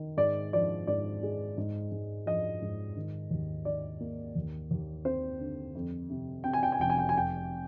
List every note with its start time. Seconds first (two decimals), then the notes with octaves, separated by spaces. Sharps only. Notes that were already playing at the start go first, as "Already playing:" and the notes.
Already playing: D#3
0.17 G#2 D5
0.53 F3 D5
0.87 G#2 D5
1.23 G#3
1.58 G#2
1.92 G#2
2.26 F3 D#5
2.62 G#2
2.97 D#3
3.31 D#2
3.65 D#3 D5
4.00 A#3
4.35 D#2
4.71 D#2
5.05 C4 C5
5.40 D3
5.75 F2
6.10 C3
6.44 C3 G5
6.53 G#5
6.63 G5
6.72 G#5
6.80 F1 G5
6.90 G#5
6.99 G5
7.09 G#5
7.14 F2 G5